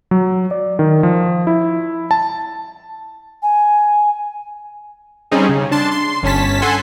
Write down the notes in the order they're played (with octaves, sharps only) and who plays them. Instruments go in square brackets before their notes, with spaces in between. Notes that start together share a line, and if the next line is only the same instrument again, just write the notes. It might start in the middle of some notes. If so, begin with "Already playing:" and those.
[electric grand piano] F#3
D5
D#3
F3
E4
A5
[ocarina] G#5
[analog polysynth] G3 C4 C#4 D#4 G#4
C#3
D4 A5 C6
C6
G1 C#4 A5 B6
A4 F#5 G#5 C6